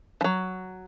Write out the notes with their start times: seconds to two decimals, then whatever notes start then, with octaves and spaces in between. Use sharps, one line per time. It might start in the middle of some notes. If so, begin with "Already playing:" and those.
0.21 E3 F#3